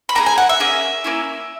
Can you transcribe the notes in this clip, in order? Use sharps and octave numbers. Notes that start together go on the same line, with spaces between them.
B5
A#3 D#4 G#4 A#5
G#5
F#5
E5
A#3 C#4 G#4
A#3 C#4 E4